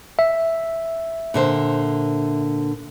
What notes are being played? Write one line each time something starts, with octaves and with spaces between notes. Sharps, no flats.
E5
A#2 D3 C5